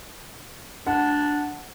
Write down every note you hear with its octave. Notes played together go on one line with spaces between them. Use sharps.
D4 F#5